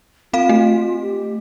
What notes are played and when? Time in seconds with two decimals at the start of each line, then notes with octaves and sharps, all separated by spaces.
0.33 C4 F4 F5
0.49 A3
1.00 G4